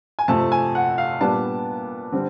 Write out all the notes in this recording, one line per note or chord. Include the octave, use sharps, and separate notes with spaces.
G#5
F2 C3 F3 A3 A5
G#5
F#5
F5
A#2 G3 B3 D4 A5
D3 G3 C4